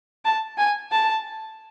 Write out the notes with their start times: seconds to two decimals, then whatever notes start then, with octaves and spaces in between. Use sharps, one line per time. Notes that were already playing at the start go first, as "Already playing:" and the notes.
0.25 A5
0.58 G#5
0.92 A5